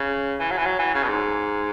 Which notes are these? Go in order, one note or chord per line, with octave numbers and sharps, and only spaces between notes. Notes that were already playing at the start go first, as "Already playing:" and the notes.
Already playing: C#3
E3
F#3
E3
F#3
E3
C#3
B2
G#2